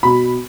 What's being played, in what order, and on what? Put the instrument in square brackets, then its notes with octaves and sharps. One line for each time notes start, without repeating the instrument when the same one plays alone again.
[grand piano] B2 [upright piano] B5